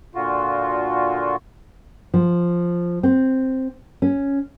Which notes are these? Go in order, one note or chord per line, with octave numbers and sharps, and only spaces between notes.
A#2 D3 F4 F#4
F3
C4
C#4